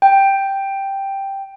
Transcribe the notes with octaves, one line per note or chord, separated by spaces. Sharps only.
G5